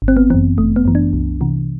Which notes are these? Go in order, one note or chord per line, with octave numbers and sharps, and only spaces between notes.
G1
C4
B3
F#2 E3 C4
G1 A3
B3
F#2 E3
D4
C2
C3 E3